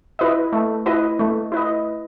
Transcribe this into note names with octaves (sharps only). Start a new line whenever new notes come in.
E4 B4 D#5
A3
E4 B4 D#5
A3
E4 B4 D#5